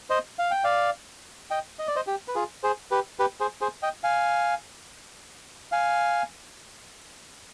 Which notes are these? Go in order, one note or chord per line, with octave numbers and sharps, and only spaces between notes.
C5 D#5
F5
G5
D5 F5
D#5 G5
D#5
D5
C5 D#5
G4
B4
F4 G#4
G#4 C5
G4 B4
G4 B4
G#4 C5
G#4 C5
D#5 G5
F5 G#5
F5 G#5